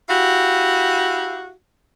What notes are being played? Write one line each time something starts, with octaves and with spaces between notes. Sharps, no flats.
E4 F#4 G4 F5